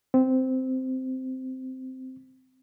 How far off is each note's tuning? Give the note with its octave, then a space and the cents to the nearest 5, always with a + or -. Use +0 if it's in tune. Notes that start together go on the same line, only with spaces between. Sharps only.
C4 -10